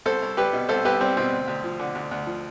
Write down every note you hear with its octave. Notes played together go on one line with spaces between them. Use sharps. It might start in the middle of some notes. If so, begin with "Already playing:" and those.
C2 A4 C5
C2
G3 G4 B4
B2
C2 A4 C5
C2 G4 B4
G3 C4
B2 C4
D2
D2
F3
D3
D2
D2
F3